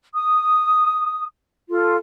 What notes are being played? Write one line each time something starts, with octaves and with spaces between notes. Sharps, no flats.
D#6
F4 A4